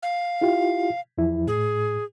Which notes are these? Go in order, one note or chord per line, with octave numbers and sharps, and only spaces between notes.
F5
E4 F4 G4
E2 F3 E4
A2 G#4